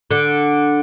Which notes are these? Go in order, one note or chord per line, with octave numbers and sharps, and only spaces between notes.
D3